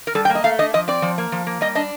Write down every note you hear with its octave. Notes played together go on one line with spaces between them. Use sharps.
A#4
G3 A4
G5
A#3
D#5
A3 F5
D4 D#5
F3 D#5
C4 D5
F3
A#3
F3
A#3
G3 D#5
D4 D#5